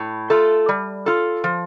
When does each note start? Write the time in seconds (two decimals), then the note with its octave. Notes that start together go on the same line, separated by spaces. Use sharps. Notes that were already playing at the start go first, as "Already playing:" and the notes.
Already playing: A2
0.30 A3 F4 A4
0.69 G3
1.06 F4 A4
1.44 F3